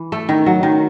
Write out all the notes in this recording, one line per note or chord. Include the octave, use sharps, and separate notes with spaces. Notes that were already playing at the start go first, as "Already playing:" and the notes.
Already playing: E3
A3
D#3
F#3
D#3